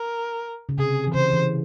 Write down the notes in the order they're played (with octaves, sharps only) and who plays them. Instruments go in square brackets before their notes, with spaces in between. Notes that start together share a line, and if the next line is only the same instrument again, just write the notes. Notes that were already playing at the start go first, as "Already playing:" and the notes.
Already playing: [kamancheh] A#4
[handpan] C#3
[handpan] C3 [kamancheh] G#4
[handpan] E3
[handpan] C#3 [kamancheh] C5
[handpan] E3